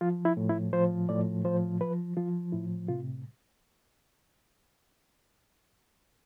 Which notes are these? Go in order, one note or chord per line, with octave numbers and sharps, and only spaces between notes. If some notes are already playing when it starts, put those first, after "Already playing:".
F3 F4
E4
A2
E4
F3 C5
A2 D5
F3 C5
F3 B4
F3 F4
A2 E4
C3 F4